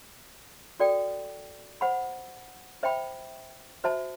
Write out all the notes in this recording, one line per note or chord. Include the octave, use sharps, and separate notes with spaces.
F#4 A4 D5 G5
C5 F#5 B5
C5 E5 G5 B5
F#4 C5 E5 A5